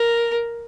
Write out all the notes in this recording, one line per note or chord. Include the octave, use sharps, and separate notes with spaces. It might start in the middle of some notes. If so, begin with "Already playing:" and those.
Already playing: A#4